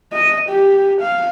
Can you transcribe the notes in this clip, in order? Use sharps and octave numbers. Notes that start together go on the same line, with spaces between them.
D#5
G4
F5